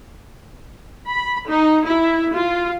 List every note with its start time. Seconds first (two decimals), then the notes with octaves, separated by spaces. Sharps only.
1.08 B5
1.48 D#4
1.88 E4
2.35 F4